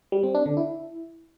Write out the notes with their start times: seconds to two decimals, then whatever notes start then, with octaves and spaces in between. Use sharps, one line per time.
0.12 G3
0.23 C4
0.35 D4
0.46 D3
0.57 E4